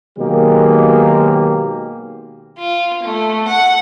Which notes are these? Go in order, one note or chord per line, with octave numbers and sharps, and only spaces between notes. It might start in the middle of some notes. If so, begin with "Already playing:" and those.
B2 D#3 F#3 G#3 A#3 G4
F4
A3
F#5